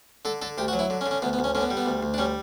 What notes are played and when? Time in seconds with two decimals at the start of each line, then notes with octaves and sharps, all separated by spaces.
0.25 D3 A4
0.41 D3 A4
0.58 D2 G4
0.68 F#4
0.73 F#3
0.79 E4
0.90 D3
1.01 C#4
1.06 D3
1.11 C#4
1.22 D2 B3
1.33 B3
1.39 D2
1.44 C#4
1.55 D3 C#4
1.61 B3
1.70 G3
1.77 B3
1.86 D2
2.03 D2
2.14 D4
2.18 G3 C#4